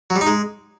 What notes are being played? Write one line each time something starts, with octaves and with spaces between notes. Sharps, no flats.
F#3
G3
D#4
G#3